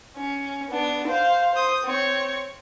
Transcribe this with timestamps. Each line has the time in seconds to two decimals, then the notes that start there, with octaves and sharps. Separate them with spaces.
0.17 C#4
0.69 B3 D4
1.08 C5 F5
1.53 C5 D#6
1.84 C4 C#5